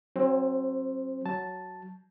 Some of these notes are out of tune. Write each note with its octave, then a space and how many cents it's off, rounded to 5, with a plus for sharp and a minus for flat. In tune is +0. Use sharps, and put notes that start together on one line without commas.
F#3 +0 C4 +30 C5 +0
F#3 +0 A5 +0